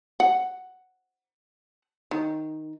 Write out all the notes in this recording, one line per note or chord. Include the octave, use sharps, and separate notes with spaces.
F#5
D#3